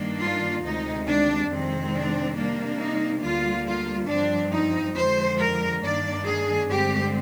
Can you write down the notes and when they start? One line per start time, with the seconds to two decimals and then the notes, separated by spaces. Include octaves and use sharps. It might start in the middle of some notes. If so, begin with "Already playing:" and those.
Already playing: G2 D#3 A#3 D4
0.20 F4
0.63 D2 C3 D#3 G#3 D#4
1.07 D4
1.49 F2 C3 D#3 G#3 C4
1.93 D4
2.36 C3 G3 A#3 D4
2.80 D#4
3.22 D2 D3 G3 A#3 F4
3.66 F4
4.08 G2 F3 C4 D4
4.52 D#4
4.95 F2 D3 F3 G#3 C5
5.39 A#4
5.82 G2 D#3 A#3 D4 D5
6.25 G#4
6.68 G2 D3 G#3 C4 G4